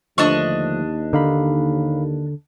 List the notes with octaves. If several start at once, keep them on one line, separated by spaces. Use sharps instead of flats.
D#2 D3 F3 A3 D4 D#5 C#6
D3 D#4 F5 B5